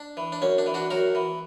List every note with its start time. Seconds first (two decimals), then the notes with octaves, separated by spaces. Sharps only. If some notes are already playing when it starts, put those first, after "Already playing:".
Already playing: D4
0.17 E3
0.32 D4
0.42 F#2 C#4
0.58 D4
0.66 E3
0.74 D4 F#4
0.91 F#2 F#4 A#4
1.15 E3